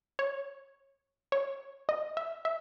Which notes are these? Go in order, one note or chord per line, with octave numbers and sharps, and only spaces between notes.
C#5
C#5
D#5
E5
E5